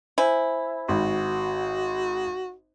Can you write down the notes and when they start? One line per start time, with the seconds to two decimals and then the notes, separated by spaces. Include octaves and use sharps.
0.18 E4 C5 G#5
0.89 G#1 F#4